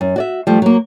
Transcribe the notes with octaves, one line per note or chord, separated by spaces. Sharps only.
F#2
F#4 D5 E5
F3 G3 A3
F#3 A#3